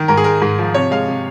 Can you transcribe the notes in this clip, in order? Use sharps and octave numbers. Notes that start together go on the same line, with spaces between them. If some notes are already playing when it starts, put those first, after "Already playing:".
Already playing: D#3
G#2 A#4
G#4
G#3 A#4
G#2
F3
C3 C#5
G#3 F5
C3